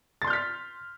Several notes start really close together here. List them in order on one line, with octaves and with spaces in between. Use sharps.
A6 C6 G6 F6 B6